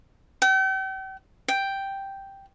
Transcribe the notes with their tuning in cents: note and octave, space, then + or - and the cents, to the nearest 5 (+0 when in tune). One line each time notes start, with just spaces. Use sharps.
G5 -40
G5 +0